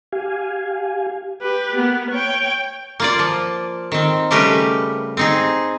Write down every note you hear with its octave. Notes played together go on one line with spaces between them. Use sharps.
G4 F5 G#5
G4 B4
A#3 B3
C#5 G5
A#3 F4 D5
F3
D#3 C4
C#3 G3 A3 G4 A#4 B4
C4 D#4 G#4